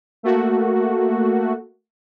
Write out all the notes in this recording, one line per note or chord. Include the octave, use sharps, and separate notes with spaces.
A3 A#3 F#4